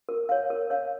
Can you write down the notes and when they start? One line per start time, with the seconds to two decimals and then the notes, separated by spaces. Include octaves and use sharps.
0.09 A#4
0.29 C#5 F5
0.50 A#4
0.70 C#5 F5